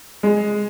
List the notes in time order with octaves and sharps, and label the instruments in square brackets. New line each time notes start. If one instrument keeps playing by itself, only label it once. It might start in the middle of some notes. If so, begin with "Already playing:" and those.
[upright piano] G#3